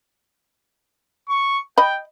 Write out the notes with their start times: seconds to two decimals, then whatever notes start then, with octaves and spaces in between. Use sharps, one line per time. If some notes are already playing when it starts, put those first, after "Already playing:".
1.29 C#6
1.78 D#5 G5 B5